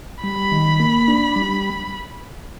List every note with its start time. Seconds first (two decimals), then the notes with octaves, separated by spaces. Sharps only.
0.23 G3 B5
0.52 D#3
0.80 A#3
1.08 D4
1.36 G3